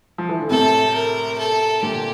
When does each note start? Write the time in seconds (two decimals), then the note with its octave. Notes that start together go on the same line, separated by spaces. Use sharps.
0.18 F3
0.29 E3
0.40 D3
0.50 A2 C3 A4
0.94 A#4
1.38 A4
1.83 A#2 D3 G4